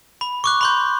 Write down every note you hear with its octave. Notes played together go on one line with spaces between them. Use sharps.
B5
C#6 D6 F#6
B5 C6 G6